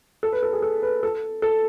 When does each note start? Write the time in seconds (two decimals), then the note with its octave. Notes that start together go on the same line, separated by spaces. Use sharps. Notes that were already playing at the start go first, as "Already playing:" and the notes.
0.23 A4
0.32 B4
0.43 A4
0.53 G#4
0.62 A4
0.83 B4
1.03 A4
1.42 A4